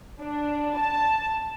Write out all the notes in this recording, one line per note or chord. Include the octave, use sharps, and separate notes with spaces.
D4
A5